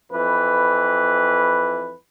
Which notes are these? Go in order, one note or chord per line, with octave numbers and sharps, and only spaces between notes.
F2 E3 B4